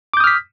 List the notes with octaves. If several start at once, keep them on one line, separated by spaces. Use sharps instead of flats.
D6 D#6 F6 G6 B6